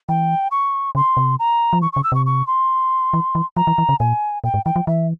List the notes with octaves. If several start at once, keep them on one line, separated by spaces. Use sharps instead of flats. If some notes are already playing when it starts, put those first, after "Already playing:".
E3 G5
C#6
C#3 C6
C3
A#5
F3
E3 C#6
C#3 C#6
E6
C3 C#6
C#6
C6
E3
E3
F3 A#5
E3
E3
C#3
A#2 G#5
A#2 G5
G#2
E3 G5
F3
E3 E5